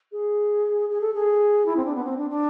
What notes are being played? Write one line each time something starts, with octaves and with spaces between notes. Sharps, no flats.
G#4
G#4
A4
G#4
E4
C4
D4
B3
C4
D4
D4